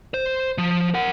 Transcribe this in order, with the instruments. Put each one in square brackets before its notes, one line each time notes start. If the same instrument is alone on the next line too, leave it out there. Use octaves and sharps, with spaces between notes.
[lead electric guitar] C5
F3
A#4 F#5